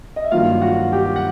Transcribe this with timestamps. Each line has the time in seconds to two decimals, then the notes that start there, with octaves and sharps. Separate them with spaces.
0.16 D#5
0.24 E5
0.31 G2 D#3 F#3 A#3 F4 F5
0.62 F#4 F#5
0.92 G4 G5
1.16 F#5